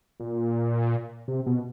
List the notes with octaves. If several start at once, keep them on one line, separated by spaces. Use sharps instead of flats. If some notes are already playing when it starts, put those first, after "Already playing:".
A#2
C3
B2